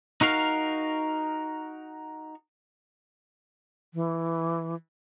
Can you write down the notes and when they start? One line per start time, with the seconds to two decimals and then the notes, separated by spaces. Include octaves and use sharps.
0.21 D#4 F#4 A#4 F5
3.94 E3